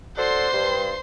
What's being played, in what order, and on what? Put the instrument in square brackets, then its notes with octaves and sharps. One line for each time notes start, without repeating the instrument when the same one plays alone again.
[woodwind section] F#4 A4 D5 [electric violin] C5 C6
[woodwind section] G2